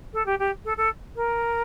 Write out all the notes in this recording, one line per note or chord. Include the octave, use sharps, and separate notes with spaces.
A4
G4
G4
A4
A4
A#4